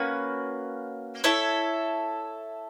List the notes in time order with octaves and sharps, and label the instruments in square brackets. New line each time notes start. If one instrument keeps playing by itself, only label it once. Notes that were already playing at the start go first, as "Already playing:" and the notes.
Already playing: [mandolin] A#3 C#4 F#4 B4
E4 A4 C#5 E5